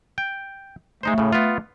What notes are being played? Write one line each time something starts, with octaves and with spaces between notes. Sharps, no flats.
G5
G#3 A3 D#4 C5
A2 C#3
B3 F4